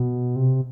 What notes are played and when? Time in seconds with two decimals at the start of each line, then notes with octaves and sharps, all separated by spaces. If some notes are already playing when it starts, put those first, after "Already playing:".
Already playing: B2
0.36 C3